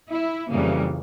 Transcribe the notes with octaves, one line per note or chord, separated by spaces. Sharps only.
E4
F2 C#3 E3 G3 A#3